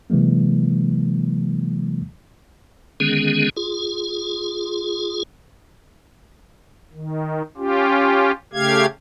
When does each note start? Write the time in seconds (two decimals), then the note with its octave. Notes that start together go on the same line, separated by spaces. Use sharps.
0.10 C3 E3 F#3 G#3 A#3
3.00 D3 D#3 G#3 B3 C#4 G#4
3.56 F4 G#4
6.93 D#3
7.57 C#4 F4 G4
8.53 C#3 A3 G4 F5 G#6